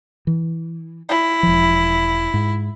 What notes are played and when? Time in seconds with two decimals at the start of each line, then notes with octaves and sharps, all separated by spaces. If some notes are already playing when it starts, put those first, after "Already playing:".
0.27 E3
1.09 E4
1.43 E1 F3
2.34 G#2